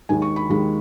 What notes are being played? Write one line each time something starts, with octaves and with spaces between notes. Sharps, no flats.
D#2 D#3 G#3 G#5
C#6
B5
D#2 D#3 G#3 B5